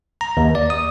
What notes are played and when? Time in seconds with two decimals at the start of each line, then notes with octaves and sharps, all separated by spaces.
0.21 A#5
0.37 D#2
0.55 D5
0.70 D#6